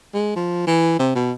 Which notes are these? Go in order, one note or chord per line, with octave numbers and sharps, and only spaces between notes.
G#3
F3
E3
C3
B2